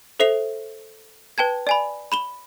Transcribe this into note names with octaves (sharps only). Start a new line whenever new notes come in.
A4 C5 E5 C7 F7
B4 G5 A5 G#6
D5 G#5 B5
B5 E7 G7